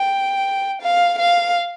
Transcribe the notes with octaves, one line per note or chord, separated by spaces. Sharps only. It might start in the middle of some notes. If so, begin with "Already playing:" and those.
Already playing: G5
F5
F5